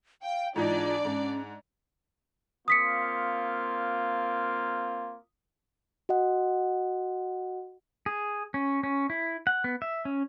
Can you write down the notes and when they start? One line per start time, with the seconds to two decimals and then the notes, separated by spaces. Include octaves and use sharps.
0.23 F5 G5
0.56 G#2 E3 D4 D#4 F4 D5
1.05 G#2 C#4
2.68 A#3 C4 F4 D#6 B6 C#7
6.09 F#4 D#5 F#5
8.06 G#4
8.54 C#4
8.83 C#4
9.10 E4
9.47 F#5
9.64 B3
9.82 E5
10.05 C#4